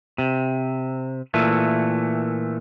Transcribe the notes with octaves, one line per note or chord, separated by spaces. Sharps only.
C3
A#2 E3 A3